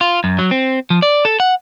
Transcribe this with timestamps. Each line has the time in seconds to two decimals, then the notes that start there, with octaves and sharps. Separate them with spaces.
0.01 F4
0.24 F#2
0.39 F#3
0.51 C4
0.90 F3
1.02 D5
1.25 A4
1.40 F#5